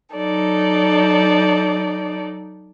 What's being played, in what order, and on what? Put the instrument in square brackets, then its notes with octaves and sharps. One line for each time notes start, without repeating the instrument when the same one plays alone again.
[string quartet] F#3 D#4 A4 D5